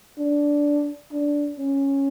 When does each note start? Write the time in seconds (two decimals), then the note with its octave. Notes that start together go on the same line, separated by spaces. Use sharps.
0.18 D4
1.12 D4
1.59 C#4